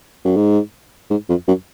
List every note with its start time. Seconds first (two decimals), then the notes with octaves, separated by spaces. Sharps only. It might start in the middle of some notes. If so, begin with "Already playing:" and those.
0.24 F#2
0.36 G#2
1.10 G#2
1.29 F2
1.47 F#2